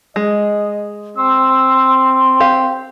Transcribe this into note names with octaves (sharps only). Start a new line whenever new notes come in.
G#3 D#5
C4 C6 E6
G4 F5